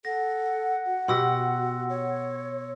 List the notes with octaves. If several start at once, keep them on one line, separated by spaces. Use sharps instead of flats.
A4 F#5 A#6
F#4
B2 G4 C6 E6 A#6
C#5